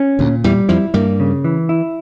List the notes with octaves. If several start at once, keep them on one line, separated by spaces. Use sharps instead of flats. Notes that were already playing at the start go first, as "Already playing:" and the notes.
Already playing: C#4
D2 A#2 D3
E2 E3 G3
F2 F3 E4
G2 G3 A#3
C#3
E3
E4